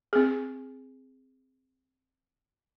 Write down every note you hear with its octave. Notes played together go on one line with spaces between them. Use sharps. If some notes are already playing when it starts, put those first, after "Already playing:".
C4 G#4